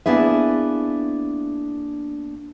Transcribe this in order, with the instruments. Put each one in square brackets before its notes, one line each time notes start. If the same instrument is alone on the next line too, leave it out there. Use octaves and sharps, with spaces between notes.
[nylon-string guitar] A#3 B3 D4 E4 G#4 E5